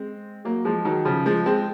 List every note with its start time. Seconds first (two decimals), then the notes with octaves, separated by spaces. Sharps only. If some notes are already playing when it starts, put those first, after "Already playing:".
Already playing: G#3 C4
0.45 F#3 A#3
0.65 F3 G#3
0.85 D#3 F#3
1.05 C#3 F3
1.26 F3 G#3
1.46 G#3 C4